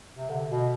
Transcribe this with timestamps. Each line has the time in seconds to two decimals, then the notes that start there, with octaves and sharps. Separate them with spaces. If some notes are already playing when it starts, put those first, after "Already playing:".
0.18 C3
0.30 D3
0.50 B2